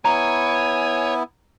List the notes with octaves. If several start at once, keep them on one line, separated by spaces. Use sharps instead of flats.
B3 E4 C#5 G#5 A#5